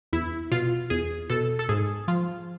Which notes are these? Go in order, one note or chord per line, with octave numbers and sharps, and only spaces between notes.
E2 E4
B2 F4
E2 G#4
B2 A4
A4
G#2 G#4
F3 F4